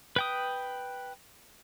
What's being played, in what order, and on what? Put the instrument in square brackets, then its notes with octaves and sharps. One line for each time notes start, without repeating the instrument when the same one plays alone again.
[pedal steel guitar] B4 G5 D#6